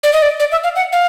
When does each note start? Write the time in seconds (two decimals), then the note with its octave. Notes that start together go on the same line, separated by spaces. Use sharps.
0.03 D5
0.13 D#5
0.22 D5
0.40 D5
0.52 E5
0.64 F5
0.76 F#5
0.92 F5